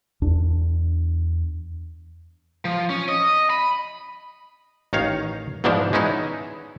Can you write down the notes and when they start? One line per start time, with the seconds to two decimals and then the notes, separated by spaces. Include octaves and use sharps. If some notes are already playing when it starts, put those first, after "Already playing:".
0.22 E2 D4
2.65 F3
2.90 C#4
3.09 D#5
3.50 B5
4.93 A1 D#3 D#4 C#5 F5
5.64 G#2 B2 E3 F3 D4 E4
5.93 G#3 B3 C#4 D#4 E4